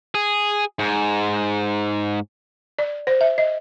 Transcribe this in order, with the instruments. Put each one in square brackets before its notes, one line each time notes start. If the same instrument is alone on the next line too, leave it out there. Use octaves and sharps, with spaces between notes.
[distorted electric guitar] G#4
G#2
[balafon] D5
C5
E5
D#5